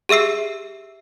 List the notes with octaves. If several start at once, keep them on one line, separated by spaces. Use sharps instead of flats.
G4 G#4 E5 E6 C7